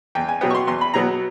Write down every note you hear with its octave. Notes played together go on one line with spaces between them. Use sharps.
E2 G5
G#5
B2 F#3 B3 G5
C#6
C6
E2 C6
B5
B2 F#3 B3 A#5